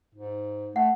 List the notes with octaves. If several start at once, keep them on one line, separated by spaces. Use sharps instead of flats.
G#2
A3 F#5